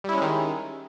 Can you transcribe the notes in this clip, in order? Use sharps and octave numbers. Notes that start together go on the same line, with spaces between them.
D#3 G3 G#3 C#4 E4